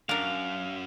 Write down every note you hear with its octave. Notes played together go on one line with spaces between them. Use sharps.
F#2 D4 A#4 F5